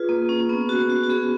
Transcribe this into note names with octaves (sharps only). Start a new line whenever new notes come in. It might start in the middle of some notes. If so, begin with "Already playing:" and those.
Already playing: F4 G#4 B4
A#3
C#4
B3
F#4
F#4
F#4
B3 G#4